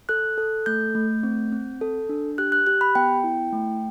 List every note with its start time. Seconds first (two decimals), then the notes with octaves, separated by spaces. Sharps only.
0.09 A4 F#6
0.38 A4
0.66 A3 G6
0.95 A3
1.23 C4
1.52 C4
1.81 A4
2.09 D4
2.38 G4 F#6
2.52 F#6
2.67 G4 F#6
2.81 B5
2.95 B3 G5
3.24 E4
3.53 A3